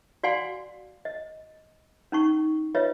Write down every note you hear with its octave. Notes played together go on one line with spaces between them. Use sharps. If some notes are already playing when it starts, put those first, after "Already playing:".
F#4 D5 F5 F#5 G#5 C6
D#5
C#4 D#4 C#6
F4 B4 C#5 D#5 E5